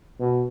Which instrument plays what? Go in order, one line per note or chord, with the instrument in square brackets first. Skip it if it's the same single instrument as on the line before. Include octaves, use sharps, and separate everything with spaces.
[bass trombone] B2